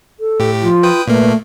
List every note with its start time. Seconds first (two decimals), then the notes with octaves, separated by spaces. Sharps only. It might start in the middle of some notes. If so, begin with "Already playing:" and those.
0.20 A4
0.40 A2 G4
0.62 F3 F4
0.83 B4 G5 D#6
1.08 A#2 A3 A#3 B4